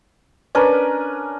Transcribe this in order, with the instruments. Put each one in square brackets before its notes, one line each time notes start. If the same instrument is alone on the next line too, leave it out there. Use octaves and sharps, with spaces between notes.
[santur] C#4 D4 A#4 B4